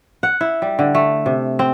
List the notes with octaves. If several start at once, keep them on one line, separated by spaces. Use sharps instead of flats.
F#5
E4
G3
D3
A3
C3
C4